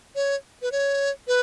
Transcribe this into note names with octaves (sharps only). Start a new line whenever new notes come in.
C#5
B4
C#5
B4